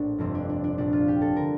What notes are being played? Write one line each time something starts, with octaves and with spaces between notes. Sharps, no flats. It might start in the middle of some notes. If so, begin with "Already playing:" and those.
Already playing: A#1 A2 D4 C5
G1 F2 C3 C4
D4
D4
D4
A#1 A#2 D4
F4
G4
A4
D3 A#4